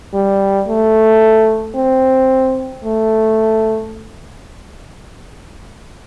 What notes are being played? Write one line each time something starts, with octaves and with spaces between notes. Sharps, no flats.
G3
A3
C4
A3